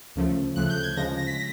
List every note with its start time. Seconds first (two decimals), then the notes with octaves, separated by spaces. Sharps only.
0.16 D2 C#3 F3 A3
0.56 D2 C#3 F3 A3 F#6
0.70 G6
0.83 G#6
0.97 D2 C#3 F3 G#3 A#6
1.17 A#6
1.27 B6
1.38 A#6